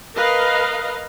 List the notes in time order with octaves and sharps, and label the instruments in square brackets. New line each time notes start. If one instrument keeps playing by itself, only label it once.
[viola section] A#4 B4 D#5 F5